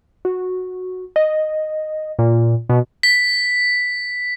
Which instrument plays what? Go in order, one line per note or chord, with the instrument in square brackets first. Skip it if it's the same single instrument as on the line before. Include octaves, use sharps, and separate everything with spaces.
[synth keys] F#4
D#5
A#2
B2
[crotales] B6